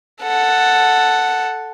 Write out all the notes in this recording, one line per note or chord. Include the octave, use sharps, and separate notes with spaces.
A4 F#5